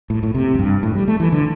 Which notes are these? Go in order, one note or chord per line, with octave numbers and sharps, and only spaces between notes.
A2
A2
C3
E2
G2
A2
G3
A3
E3
D3